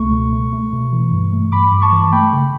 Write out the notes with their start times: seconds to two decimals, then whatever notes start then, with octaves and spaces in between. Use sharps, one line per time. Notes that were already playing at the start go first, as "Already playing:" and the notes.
Already playing: C#2 B2 A3 C#6
0.12 B2
0.33 A3
0.53 A3
0.73 B2
0.92 E3
1.12 G2
1.33 A3
1.52 G2 B5 D6
1.72 G2
1.82 A5 C#6
1.92 E3
2.12 A3 G5 B5
2.33 C#3